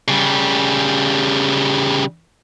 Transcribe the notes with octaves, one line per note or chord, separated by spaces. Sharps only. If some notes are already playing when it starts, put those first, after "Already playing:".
C#3 G3